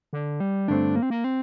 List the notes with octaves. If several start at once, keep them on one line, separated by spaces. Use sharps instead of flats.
D3
G3
G2 D3 A3 C4 D4
A#3
C4
A#3
C4